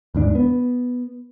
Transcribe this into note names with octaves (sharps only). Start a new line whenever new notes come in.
D#2 G#2 D4
B3